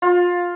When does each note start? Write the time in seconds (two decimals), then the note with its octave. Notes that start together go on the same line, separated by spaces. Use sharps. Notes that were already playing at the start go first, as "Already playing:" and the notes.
0.02 F4